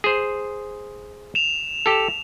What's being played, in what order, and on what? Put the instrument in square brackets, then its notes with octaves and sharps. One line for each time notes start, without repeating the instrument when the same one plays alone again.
[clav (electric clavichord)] G#4 C5
[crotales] E7 F7
[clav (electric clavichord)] G4 A4